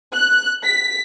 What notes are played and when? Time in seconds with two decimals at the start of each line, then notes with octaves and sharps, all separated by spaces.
0.14 F#6
0.64 B6